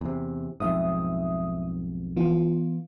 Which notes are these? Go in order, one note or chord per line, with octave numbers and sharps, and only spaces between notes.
E2 C3
B1 F2 G#2 E5 D#6
E3 B3 F4